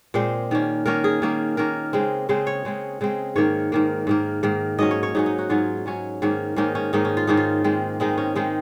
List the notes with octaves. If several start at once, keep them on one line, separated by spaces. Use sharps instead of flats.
A#2 G#3 C4 C5
D#3 A#3 C#4
D#3 A#3 C#4 A#4
G#4
D#3 A#3 C#4
D#3 A#3 C#4 A#4
C#3 G#3 C4
C#3 G#3 C4 C5
C#5
C#3 G#3 C4
C#3 G#3 C4
G#2 D#3 A#3 C#5
G#2 D#3 A#3
G#2 D#3 A#3
G#2 D#3 A#3
G#2 F#3 C#4 D#5
C#5
C#5
G#2 F#3 C#4 D#4
D#4
F#4
G#2 F#3 C#4 F4
G#2 F#3 C#4
G#2 D#3 A#3 C#4
G#2 D#3 A#3 C#4 D#4
C#4
G#2 D#3 A#3 C#4 D#4
C#4
F4
G#2 D#3 A#3 C#4 D#4
F4
D#3 G#3 C4
D#3 G#3 C4 D#4
C#4
D#3 G#3 C4 D#4